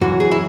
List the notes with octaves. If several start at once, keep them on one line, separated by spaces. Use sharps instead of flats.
F#2 E3 F#4
G#4
E4